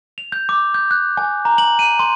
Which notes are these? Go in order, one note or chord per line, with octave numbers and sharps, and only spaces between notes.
F7
G6
D6
G6
F#6
G#5
A#5
F#7
D#7
C6